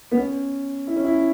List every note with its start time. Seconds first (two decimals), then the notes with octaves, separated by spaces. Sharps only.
0.11 B3
0.16 C#4
0.87 E4
0.96 C#4
1.04 E4